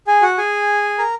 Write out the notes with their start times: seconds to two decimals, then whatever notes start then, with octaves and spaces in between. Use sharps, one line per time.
0.07 G#4 G#5
0.22 F#4 F#5
0.38 G#4 G#5
0.99 A#4 A#5